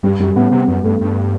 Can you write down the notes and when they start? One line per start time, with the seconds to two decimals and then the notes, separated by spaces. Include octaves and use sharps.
0.03 G2 G3
0.19 F#2 G3
0.36 A2 B3
0.51 C3 B3
0.68 F#2 B3
0.84 G2 A3
1.01 G2